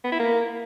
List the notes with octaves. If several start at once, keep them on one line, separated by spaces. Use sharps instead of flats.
B3
E4
A#3